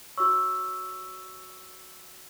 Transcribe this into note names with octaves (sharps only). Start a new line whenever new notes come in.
F#4 C#5 C#6 E6